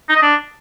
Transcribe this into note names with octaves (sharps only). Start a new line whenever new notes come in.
D#4
D#5
D4